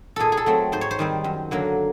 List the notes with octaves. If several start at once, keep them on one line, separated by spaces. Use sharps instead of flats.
A#2 G#4 A4
G#4
A4
F#3 A3 C4
G#2 C5
C#5
C5
D#3 G3 C4
F#2
D3 F#3 A#3